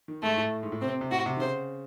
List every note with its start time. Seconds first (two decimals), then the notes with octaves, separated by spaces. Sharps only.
0.08 D#3
0.22 G#2 A3
0.37 A2
0.63 G#2
0.72 A2
0.81 C3 C4
1.01 C3
1.11 A2 F#4
1.26 C3
1.37 D#3
1.41 C#3 C5